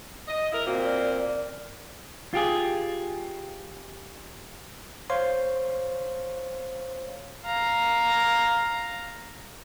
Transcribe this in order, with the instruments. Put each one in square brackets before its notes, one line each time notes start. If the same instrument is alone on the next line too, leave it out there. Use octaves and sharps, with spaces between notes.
[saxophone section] D#5
E4 A#4
[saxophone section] A#2 A#3 C4 [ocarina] F#4
[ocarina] D5
[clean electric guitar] F4 G4 G#4
[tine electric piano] C5 C#5 F5 C6
[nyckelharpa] F5 A#5